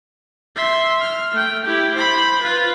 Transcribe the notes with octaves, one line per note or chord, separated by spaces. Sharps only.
E5 C6
F6
A3 G5
E4 G4
C5 B5
F4 B4